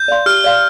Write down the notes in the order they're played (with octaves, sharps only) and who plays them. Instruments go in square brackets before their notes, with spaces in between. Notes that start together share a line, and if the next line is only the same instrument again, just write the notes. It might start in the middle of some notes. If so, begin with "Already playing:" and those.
Already playing: [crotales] G6
[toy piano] D5 F5 C6
[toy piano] G4 [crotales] F6
[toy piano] D5 F5 C6